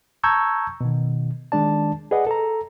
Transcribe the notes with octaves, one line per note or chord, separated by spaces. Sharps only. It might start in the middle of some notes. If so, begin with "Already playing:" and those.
A5 A#5 C#6 E6 G6 G#6
B2 D#3
D#3 G#3 D4 D5 A5
G#4 B4 D5 D#5 F#5
A4 A#5